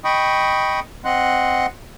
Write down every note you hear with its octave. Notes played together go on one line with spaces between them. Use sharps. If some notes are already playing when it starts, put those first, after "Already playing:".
D#5 G5 B5 C#6 D#6
C4 D#5 F#5 C6 F#6